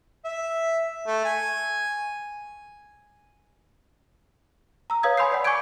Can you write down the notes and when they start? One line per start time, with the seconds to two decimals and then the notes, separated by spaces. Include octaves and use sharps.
0.25 E5
1.07 A3
1.25 G#5
4.90 A#5 E6
5.03 B4 C#5 F5 D#6 E6 G#6
5.17 G#5 B5 C6 E6 G6 C7
5.32 D5 F#5
5.45 G#5 C#6 D6 G6 G#6 D7